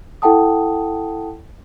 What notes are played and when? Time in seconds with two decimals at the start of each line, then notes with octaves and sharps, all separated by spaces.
0.22 E4 A4 F#5 G5 A5 D#6